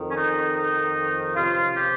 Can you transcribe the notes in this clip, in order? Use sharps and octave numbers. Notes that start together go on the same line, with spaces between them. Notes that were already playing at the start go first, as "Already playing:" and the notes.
Already playing: F2 D#3
C#4
D#4
D#4
C#2 C3 F3 F4
G4